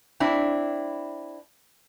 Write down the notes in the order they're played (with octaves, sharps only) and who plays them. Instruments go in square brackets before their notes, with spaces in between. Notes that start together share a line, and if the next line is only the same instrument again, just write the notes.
[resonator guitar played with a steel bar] C4 D4 E4